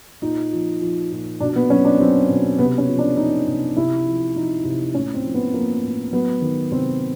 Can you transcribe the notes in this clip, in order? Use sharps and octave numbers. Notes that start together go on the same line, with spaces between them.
A#2 D#4
F3
F3
A#2
B2 D4
B3
F#3 C#4
D4
F#3 C4
B2
C3 B3
C#4
F3
D4
F3 D#4
C3
C3 E4
F3
F3 D#4
C3
A2 C#4
C4
F3
B3
F3 A#3
A2
F#3 B3
D#3
C3 C4